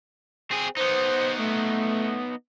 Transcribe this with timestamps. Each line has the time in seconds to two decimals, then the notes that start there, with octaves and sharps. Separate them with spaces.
0.51 C4 G#4
0.77 B3 D#4 C5
1.38 A3